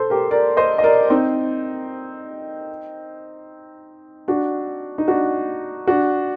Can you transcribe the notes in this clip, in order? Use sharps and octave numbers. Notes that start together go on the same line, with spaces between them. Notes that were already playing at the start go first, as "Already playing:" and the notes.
Already playing: A4 C5
G4 A#4
A#4 D5
C5 D#5
D#5
A#4 D5
C4 D#4
D4 F#4
D#4
D4 F#4
D4 F#4